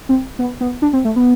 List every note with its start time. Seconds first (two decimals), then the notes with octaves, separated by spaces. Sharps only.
0.09 C4
0.39 B3
0.61 B3
0.82 D4
0.93 C4
1.05 A3
1.16 B3